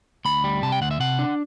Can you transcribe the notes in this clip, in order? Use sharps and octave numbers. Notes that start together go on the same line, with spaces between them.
D2 B5
G3
C3 A5
G5
D2 F#5
E5
C3 F#5
D4